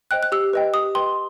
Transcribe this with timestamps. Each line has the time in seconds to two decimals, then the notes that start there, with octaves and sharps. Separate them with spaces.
0.11 C5 D#5 G5 F#6
0.23 F#6
0.32 G4 E6
0.53 B4 D#5 G5
0.74 G4 D#6
0.95 B4 D#5 G5 C6